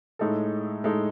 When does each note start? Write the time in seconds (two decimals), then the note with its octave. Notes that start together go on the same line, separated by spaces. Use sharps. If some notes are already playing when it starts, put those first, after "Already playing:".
0.19 A2 G#3 D#4 A4
0.84 A2 G#3 D#4 A4